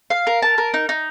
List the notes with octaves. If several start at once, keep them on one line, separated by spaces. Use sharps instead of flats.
F5
A#4
A5
A#4
D#4
D#4